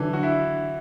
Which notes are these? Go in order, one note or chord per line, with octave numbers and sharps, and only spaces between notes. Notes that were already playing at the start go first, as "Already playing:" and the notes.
Already playing: D3 E3 F#3 D4
F#4
E4